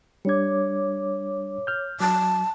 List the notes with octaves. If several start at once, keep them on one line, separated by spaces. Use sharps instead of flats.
G3 D4 C#5 D6 G#6
F6 G6
F#3 A5